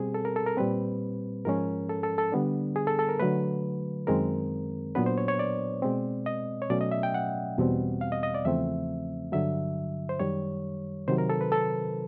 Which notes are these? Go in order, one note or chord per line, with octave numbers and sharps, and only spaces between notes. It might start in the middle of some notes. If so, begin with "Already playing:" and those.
Already playing: B2 G3 C4 G#4
A4
A#4
A4
A#4
A#2 G3 C4 B4
G#2 F3 G#3 C#4 A#4
A4
A4
A4
D3 G3 B3 D4
G#4
A4
A4
A#4
D3 F#3 A3 B4
F#2 D#3 G#3 C4 A#4
A#2 F#3 B3 D4 B4
C5
C#5
C#5
D5
B2 G#3 C4
D#5
C#5
B2 F#3 A3 C#4 D5
D#5
E5
G5
F#5
E2 B2 G3 C4
F5
D#5
D#5
D5
E2 C#3 F3 A3 C4 E5
G2 D3 F#3 E5
C5
F#2 D#3 G3 C#5
C3 D#3 F#3 C5
A#4
A4
B4
A4